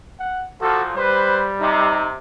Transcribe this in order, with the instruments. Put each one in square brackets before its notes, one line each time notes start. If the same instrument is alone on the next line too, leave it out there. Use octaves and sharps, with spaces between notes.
[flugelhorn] F#5
[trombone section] A#2 F3 [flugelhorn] F#4 [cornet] A4
[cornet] G3 [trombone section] B4 [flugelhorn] C5
[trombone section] C3 [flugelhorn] D#4